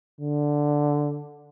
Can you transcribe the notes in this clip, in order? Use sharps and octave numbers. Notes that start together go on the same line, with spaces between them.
D3